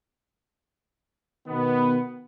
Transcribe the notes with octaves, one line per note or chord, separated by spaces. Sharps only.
B2 D#3 B3